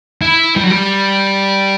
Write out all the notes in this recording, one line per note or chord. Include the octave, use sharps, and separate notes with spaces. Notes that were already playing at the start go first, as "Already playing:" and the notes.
E4
G3
F#3
G3